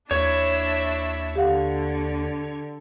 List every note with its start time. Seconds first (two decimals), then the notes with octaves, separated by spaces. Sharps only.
0.11 D#2 D4 E4 C#5 E5
1.36 D3 G4 F5 F#5